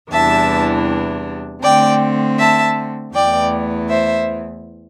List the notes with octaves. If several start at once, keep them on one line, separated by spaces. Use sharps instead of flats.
E2 C3 E3 G3 D4 E5 A5
D3 A3 C4 D5 G5
E5 A5
E2 E3 A3 D5 G5
C5 E5